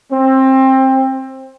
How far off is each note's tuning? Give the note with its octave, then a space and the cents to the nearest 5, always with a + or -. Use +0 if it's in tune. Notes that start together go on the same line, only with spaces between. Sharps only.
C4 +20